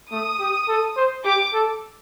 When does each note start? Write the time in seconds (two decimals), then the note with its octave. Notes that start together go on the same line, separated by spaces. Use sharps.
0.11 A3 D#6
0.40 G4
0.68 A4
0.97 C5
1.25 G4 D6
1.54 A4